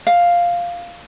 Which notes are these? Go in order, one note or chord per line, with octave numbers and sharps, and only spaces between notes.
F5